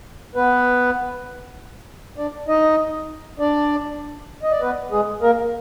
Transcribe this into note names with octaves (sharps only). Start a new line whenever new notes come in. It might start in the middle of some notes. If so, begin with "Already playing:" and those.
B3 B4
D4 D5
D#4 D#5
D4 D5
D#5
D5
B3 B4
G#3 G#4
A#3 A#4